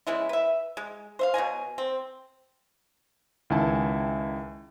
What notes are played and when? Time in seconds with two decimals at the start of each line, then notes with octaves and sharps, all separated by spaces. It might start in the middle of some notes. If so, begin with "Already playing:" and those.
0.07 C#3 G#3 B3 E4
0.29 B4 E5
0.77 G#3
1.19 C5 E5 F5
1.34 B2 F#3 D#5 G#5
1.78 C4
3.50 C#2 D#3 E4 G#5 A5